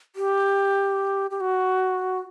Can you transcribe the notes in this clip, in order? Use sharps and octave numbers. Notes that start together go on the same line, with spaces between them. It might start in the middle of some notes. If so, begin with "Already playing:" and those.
G4
G4
F#4